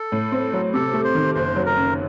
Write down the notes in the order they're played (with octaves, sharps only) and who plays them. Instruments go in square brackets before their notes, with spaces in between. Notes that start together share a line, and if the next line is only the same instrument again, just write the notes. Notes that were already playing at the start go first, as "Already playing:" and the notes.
Already playing: [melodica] A4
[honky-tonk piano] A2
C4
F#3
[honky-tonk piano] C3 [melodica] A4
[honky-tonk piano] A3
[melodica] C5
[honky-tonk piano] D#3
[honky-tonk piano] F#1 [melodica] C5
[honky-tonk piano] F#3
[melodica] A#4
[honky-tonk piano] F#2